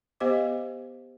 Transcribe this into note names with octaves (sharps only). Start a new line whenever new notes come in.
B3 G4 C5 D#5 F5 D6